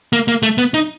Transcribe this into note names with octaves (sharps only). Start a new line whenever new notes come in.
A#3
A#3
A3
B3
D#4